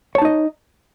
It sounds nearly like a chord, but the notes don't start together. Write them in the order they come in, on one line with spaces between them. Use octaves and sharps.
C#5 A5 D#4 D#5